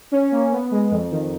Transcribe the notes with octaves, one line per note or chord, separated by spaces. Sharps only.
C#4
A#3
B3
G#3
F2
D#3